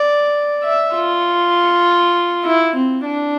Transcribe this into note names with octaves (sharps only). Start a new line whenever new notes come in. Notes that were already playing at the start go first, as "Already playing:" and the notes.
Already playing: D5
E5
F4
E4
C4
D4